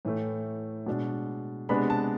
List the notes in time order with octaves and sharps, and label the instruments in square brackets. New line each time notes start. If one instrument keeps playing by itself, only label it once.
[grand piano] A2 E3 A3
B2 G#3 D4
C3 G#3 B3 D4 B5
A5